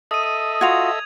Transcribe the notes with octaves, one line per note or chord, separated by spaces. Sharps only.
A4 D#5 E5 D#6 D#7
D#7
F4 F#4 G#6 F7